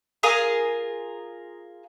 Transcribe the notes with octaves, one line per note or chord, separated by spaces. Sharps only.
F4 G#4 A#4